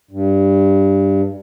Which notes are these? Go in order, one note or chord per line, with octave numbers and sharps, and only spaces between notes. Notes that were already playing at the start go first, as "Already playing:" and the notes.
G2